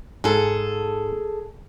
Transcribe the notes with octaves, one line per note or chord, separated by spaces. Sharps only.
G#2 G#4 A4